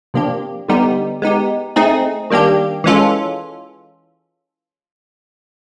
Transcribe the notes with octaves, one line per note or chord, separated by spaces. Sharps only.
C3 F3 A#3 D4 G4
D3 G3 B3 D#4 G4
G#3 B3 D#4 G4
A3 C4 D#4 G#4
D#3 G3 A#3 D4 G4
E3 G#3 C#4 F4 A4